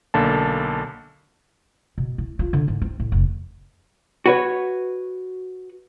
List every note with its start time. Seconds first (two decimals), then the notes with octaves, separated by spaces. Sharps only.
0.14 B1 D3 A#3 A5
1.98 B2
2.18 E4
2.39 F4
2.53 D3
2.68 G#2
2.82 C4
3.00 A2
3.12 F1
4.26 F#4 B4 C#5